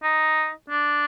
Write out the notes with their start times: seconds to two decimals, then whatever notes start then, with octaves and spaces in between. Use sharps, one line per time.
0.03 D#4
0.70 D4